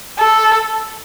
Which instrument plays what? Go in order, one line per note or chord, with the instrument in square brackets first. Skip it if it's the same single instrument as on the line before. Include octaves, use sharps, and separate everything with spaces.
[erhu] A4